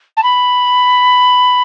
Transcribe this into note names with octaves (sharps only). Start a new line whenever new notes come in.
A5
B5